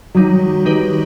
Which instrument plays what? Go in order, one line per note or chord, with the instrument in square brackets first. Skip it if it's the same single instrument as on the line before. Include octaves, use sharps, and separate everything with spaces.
[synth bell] D#3 G3 D#4 [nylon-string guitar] F#3
[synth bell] D#3 G3 D#4 G4 B4